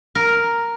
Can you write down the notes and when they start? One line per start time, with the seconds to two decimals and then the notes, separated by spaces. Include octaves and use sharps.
0.15 A#4